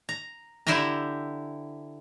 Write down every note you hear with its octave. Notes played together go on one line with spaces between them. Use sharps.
A#5
D3 E4 G4 C5 E5 A#5